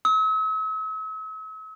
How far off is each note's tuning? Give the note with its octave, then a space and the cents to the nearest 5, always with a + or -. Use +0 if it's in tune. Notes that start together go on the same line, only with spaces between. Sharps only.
E6 -45